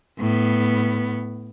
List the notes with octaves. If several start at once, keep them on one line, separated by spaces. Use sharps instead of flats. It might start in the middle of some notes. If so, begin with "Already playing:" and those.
A2 B3